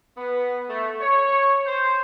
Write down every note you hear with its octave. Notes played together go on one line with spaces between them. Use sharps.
B3
A3
C#5
C5